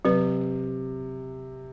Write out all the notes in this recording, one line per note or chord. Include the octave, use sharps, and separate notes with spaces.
C3 F#3 B4